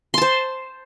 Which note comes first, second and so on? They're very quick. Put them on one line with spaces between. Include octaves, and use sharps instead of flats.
C6 A5 C5